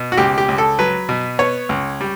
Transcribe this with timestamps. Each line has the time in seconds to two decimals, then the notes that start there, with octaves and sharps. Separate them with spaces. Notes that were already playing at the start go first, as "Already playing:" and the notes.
Already playing: B2
0.12 F#4
0.17 C#2 G4
0.38 G4
0.49 C#2
0.58 A4
0.79 F#3 B4
1.09 B2
1.39 B3 C#5
1.69 C#2
2.01 G3